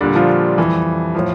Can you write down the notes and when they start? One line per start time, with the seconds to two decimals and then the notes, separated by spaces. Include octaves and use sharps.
0.01 A#2 D3 G3 D4
0.15 F3 F4
0.58 F2 E3 G3
1.15 A2 F3